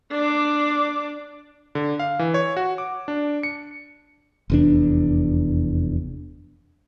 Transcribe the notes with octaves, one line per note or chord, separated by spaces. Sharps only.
D4 D6
D3
F5
E3
C#5
F#4
D6
D4
C#7
F1 E2 D4